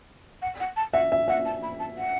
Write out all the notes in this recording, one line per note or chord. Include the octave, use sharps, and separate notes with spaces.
F#5
F#5
A5
E5 F#5
E5
E5 F#5
A5
B5
A5
F#5